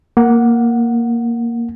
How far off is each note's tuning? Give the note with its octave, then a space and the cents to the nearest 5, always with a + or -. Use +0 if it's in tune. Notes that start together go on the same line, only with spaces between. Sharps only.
A#3 +0 F#5 -5